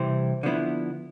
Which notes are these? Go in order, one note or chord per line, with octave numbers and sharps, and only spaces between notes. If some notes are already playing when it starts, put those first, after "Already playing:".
Already playing: C3 E3 G3 C4 E4 C5
D3 F3 B3 E4